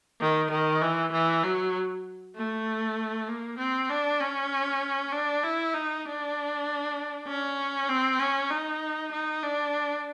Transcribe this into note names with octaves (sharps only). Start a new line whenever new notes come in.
D#3
D#3
E3
E3
F#3
A3
A#3
C4
D4
C#4
D4
E4
D#4
D4
C#4
C4
C#4
D#4
D#4
D4